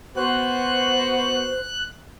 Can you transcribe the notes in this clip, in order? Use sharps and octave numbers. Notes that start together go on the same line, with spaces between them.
B3 F#4 C5 F#6